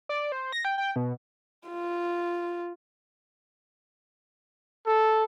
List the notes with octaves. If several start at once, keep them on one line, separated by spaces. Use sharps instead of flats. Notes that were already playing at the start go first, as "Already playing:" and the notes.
D5
C5
A#6
G5
G5
B2
F4
A4